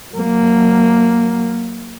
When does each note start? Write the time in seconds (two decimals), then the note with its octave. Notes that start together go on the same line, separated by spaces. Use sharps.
0.13 F#3 A#3